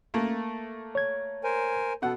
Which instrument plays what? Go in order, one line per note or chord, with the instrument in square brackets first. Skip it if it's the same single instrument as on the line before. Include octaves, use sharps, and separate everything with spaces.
[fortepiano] A3 A#3
[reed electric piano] C#5 G#6
[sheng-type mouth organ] A#4 C5 G#5
[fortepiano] B2 F#5 [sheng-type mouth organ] A4